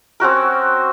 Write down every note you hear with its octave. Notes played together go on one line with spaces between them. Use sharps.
C4 C#4 F#4 A#4